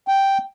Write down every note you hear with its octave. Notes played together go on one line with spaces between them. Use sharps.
G5